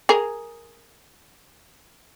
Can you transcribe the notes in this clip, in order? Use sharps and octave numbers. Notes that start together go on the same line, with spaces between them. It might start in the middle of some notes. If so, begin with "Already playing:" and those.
G#4 A#4